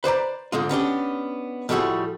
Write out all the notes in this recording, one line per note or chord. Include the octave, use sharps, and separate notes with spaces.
B4 C5 D5 A#5
G#2 D3 G#3 F4
B3 C#4 D4 G4
A2 F3 G3 A3 F#4 G#4